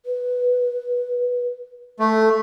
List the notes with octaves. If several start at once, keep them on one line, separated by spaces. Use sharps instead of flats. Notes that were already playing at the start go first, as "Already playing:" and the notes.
B4
A3 A4